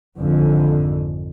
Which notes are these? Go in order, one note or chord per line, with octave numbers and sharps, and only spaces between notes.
G#1 F2 G#2 D3